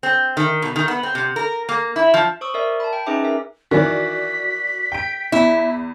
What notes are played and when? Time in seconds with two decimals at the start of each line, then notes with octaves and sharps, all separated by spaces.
0.03 C4
0.37 D#3
0.62 B2
0.76 D#3
0.88 B3
1.03 C4
1.15 C3
1.36 A#4
1.69 A#3
1.96 E4
2.14 F3
2.41 C5 C#6 D#6 E6
2.54 A#4 D5 E5
2.80 A5 B5
2.93 G5
3.06 C#4 D#4 G#4 B4 E5 D6
3.24 A#4 E5
3.71 D#3 E3 F#4 D5 B6
4.92 G5 D7
5.32 E2 E4